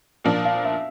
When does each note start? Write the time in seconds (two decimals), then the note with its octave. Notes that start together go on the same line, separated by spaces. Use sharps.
0.24 A#2 F3 A#3 D4
0.45 F5
0.64 E5